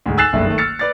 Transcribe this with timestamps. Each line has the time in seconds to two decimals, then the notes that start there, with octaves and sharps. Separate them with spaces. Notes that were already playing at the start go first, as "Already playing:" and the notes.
0.06 D2 G#2
0.17 G#5 E6 F#6 A6 C7 E7
0.33 F#1 G2 A3 E5
0.46 D#3 A3
0.58 E6 F6 A6 C#7
0.79 B4 D5 A6